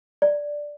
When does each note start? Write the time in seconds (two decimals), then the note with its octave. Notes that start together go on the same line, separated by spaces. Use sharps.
0.22 D5